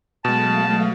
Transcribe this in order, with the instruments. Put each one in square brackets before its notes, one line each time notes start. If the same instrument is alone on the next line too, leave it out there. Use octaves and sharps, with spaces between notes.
[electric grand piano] B2 G#3 [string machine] F#3 A3 F5 [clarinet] A5